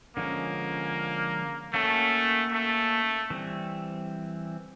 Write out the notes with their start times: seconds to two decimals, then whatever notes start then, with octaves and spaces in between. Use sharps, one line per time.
0.17 D3 F3 G#3 A#3 C#4
1.74 A3 A#3 C#4 F#4 A4 C#5
2.53 A3
3.30 E3 G3 C4